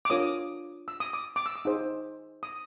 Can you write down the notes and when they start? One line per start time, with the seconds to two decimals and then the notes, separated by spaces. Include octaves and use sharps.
0.05 D6
0.10 D4 F4 A#4 C#5 D#6
0.88 E6
1.00 D#6
1.13 D6
1.36 D6
1.46 E6
1.56 D#6
1.65 D#4 G#4 C5
2.43 D#6